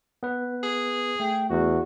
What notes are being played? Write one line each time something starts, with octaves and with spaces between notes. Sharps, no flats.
B3 B4
G#4
A3 G5
E2 F#4